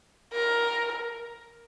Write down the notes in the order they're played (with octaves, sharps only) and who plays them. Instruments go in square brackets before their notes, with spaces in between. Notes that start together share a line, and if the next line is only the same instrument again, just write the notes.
[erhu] A#4